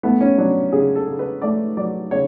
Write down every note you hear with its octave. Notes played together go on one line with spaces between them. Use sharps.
A3 B3
C#4
F#3 D4
C#3 G#4
A4
C#3
B4
A3 D5
F#3 D5
C#3 C#5